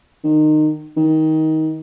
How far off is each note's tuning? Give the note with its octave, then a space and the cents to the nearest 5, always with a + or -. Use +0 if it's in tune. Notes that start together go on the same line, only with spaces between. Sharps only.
D#3 -25
D#3 +20